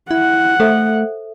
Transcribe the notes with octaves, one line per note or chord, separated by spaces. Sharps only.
E4 F#5
A3 A4 C5 E5